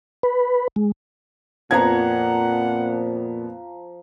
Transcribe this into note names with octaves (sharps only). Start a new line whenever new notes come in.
B4
G#3
F2 A#2 F3 B3 F#5 A#5 G#6